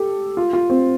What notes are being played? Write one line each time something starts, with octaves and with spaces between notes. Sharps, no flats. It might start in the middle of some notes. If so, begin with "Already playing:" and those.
Already playing: G4 A4
F4
F4
C4